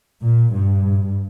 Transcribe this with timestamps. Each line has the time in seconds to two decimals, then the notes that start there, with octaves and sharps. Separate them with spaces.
0.22 A#2
0.53 G2